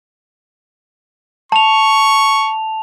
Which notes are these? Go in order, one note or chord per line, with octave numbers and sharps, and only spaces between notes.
A5 C#6 F7